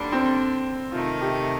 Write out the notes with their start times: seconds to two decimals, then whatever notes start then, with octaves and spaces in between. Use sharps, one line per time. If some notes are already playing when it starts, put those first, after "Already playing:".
Already playing: D#2 D3 G3 D4
0.12 C4
0.92 C3 D#3 A3 D#4 F4
1.21 G4